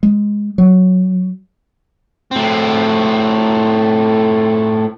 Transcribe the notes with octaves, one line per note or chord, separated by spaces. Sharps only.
G#3
F#3
A2 C4